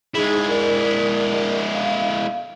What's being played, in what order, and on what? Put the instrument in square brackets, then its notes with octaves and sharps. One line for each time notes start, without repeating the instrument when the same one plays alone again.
[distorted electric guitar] G#3 E4 [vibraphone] D#4 G#4
[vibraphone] A#4 D5
F5